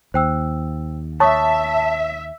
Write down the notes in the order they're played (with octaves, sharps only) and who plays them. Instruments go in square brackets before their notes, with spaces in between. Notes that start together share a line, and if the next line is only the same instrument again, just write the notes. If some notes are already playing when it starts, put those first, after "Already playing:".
[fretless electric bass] D#2 [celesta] C5 G5 E6
[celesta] C#5 C#6 D#6 [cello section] E5 [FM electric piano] A5